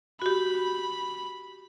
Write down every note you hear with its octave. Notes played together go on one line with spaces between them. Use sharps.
F#4 G4 B5